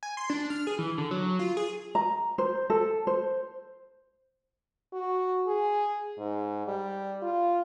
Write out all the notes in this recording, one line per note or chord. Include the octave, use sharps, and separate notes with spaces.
G#5
C6
D4
F6
G#4
E3
D3
F#3
F4
G#4
A#5
C5
A4
C5
F#4
G#4
G#2
G3
F4